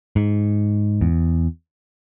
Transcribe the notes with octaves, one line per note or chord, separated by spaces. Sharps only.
G#2
E2